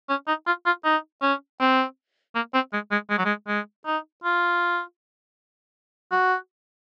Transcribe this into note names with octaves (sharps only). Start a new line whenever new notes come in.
C#4
D#4
F4
F4
D#4
C#4
C4
A#3
C4
G#3
G#3
G#3
F#3
G#3
G#3
D#4
F4
F#4